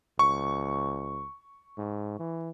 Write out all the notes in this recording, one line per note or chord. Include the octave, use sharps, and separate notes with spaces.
C#2 C#6
G#2
E3